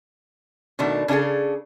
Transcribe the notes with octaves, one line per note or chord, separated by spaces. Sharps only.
B2 D#3 A3 D4
C#3 D4 D#4 G#4 A4